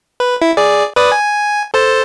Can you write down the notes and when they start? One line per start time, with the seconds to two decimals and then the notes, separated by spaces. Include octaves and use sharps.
0.20 B4
0.42 E4
0.57 G#4 D5
0.96 B4 D5 D#6
1.12 G#5
1.74 A4 C5 A5